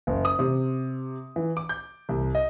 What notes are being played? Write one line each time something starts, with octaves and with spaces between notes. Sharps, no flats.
F#1
D#6
C3
E3
D6
G6
C2
D#5